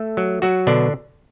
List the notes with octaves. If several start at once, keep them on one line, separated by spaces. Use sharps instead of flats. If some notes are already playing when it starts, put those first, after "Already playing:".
Already playing: A3 A4
F#3
F#3 F#4
B2 D3 D4